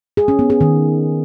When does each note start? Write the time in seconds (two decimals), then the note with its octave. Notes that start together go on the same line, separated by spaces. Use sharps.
0.17 G#4
0.28 C#4
0.39 B3
0.50 G#4
0.61 D#3